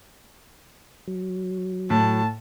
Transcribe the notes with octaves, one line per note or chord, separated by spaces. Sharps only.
F#3
A2 A5